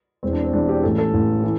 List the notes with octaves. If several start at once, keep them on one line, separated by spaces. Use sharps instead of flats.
E1 E2 E3 C4
D4
C4
E1 E2 E3 D4
G4
A1 A2 E3 A4
A4
A1 A2 E3
E3